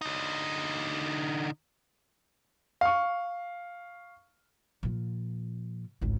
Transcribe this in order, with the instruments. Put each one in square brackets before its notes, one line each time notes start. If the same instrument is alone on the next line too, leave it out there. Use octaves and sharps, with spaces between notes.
[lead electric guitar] D3 D#4
[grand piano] F5 C#6
[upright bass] A#2 F3
G#1 C#2